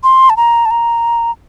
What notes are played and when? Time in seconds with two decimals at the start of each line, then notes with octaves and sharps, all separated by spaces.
0.03 C6
0.30 A5
0.37 A#5
0.65 A5
0.71 A#5